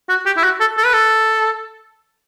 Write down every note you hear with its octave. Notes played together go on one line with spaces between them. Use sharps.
F#4
G4
E4
F#4
A4
A4
B4
A4